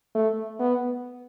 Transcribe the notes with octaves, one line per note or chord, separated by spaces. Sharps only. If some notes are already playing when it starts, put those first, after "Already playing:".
A3
B3